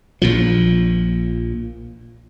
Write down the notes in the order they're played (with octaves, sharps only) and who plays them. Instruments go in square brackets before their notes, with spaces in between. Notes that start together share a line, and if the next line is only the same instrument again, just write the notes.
[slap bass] A#1 A#2 F3